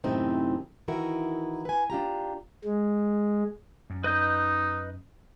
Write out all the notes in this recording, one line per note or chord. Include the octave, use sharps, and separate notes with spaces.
F#2 A2 C3 D#3 C4 D#4
D#3 E3 D#4 E4 F#4 A#4
B4 G#5
D4 F4 G4 A#5
G#3
F#2
D#4 B4 D#5 G6